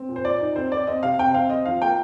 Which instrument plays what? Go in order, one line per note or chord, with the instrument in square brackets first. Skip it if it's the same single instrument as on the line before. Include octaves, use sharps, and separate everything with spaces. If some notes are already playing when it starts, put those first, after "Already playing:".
Already playing: [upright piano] C4
A#2
C5
A#2 D5
D#4
C4 C5
C4 D5
C4 D#5
C3 F5
C4 G5
C4 F5
C4 D#5
F3 F5
A#3 G5